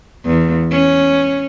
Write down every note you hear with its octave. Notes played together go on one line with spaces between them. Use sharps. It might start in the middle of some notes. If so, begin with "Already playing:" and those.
E2
C#4